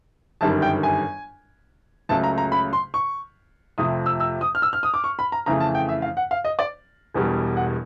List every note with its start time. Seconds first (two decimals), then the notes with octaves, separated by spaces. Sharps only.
0.41 G1 F#2 D#3 G3 A5
0.62 G5
0.83 G#5
2.09 C#2 C#3 F#3 A3 A5
2.24 A#5
2.38 A#5
2.52 B5
2.73 C6
2.94 C#6
3.78 F2 C3 F3 A3 D#6
4.06 E6
4.20 E6
4.41 D#6
4.55 F6
4.62 E6
4.73 F6
4.83 D#6
4.94 D6
5.04 C#6
5.19 B5
5.32 A#5
5.46 F2 C#3 E3 A3 A#5
5.60 A5
5.75 G5
5.89 E5
6.02 F5
6.17 F#5
6.31 F5
6.45 D#5
6.59 D5
7.14 E1 E2 B2 G3
7.57 F#5